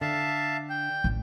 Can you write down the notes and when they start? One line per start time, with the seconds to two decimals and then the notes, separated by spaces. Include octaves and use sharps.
0.01 D3 E5 F5 A5
0.69 G5
1.04 A1